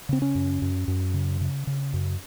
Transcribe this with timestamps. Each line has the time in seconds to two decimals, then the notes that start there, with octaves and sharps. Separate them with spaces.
0.09 C#3 C4
0.22 C#4
0.35 F#2
0.62 F#2
0.88 F#2
1.14 C#3
1.41 C#3
1.67 C#3
1.93 F#2